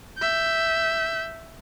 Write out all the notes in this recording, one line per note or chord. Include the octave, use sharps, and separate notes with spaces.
E5 G6